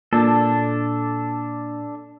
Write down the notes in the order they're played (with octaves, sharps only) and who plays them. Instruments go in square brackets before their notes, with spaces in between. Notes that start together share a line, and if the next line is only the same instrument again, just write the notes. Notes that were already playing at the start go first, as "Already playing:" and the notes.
[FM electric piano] A#2 [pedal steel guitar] D4 A4